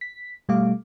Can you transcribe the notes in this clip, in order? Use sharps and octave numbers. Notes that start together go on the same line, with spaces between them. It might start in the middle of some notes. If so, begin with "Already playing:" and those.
B6
B2 G3 A3 F5 D6